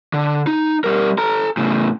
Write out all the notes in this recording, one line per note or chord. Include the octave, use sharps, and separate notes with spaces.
D3
D#4
G3 A#4
A4 A#5
A2 C#3